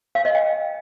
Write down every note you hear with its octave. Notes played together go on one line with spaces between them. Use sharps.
F5
D#5
G5